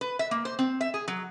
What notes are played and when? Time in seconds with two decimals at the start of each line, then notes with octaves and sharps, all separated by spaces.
0.01 B4
0.19 E5
0.31 A#3
0.45 C5
0.59 C4
0.81 E5
0.94 G#4
1.08 F#3